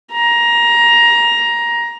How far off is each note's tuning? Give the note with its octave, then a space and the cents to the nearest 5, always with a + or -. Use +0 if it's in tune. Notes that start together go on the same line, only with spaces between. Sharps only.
A#5 +15